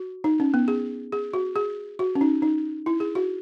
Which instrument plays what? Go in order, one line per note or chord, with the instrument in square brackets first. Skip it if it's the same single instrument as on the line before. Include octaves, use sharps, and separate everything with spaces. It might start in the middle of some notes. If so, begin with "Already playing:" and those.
Already playing: [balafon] F#4
D#4
C#4
B3
G#4
G#4
F#4
G#4
F#4
C#4
D#4
D#4
E4
G#4
F#4